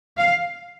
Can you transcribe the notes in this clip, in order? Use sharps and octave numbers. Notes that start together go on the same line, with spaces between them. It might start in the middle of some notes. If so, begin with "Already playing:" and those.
F5